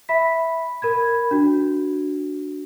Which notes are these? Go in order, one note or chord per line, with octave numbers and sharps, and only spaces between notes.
E5 B5 B6
A#4 B5 G#6
D4 F#4